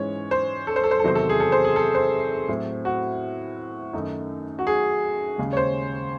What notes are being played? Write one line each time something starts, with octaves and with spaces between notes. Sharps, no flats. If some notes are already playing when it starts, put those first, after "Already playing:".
Already playing: G#2 E3 G#3 C#4 C#5
C5
A4
C5
A4
C5
A4
E2 C3 D#3 F#3 C4 C5
A4
G#4
A4
C5
G#4
A4
C5
A2 F#3 C4 E4
F#4
F#2 D#3 A3 D#4
F#4
G#4
D#2 C#3 G#3
C#5
C5